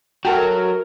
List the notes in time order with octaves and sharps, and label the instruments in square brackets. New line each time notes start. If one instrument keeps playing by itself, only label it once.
[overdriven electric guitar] F#3 [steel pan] F#4 A4 [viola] A#4 [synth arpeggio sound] G5 A5